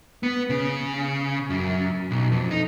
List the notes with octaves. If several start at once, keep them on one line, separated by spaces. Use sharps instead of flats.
B3
C#3
F#2
B1
F2
D#4